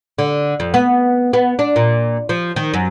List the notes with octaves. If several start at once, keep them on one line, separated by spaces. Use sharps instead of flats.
D3
F2
B3
B3
D4
A#2
F3
D#3
F#2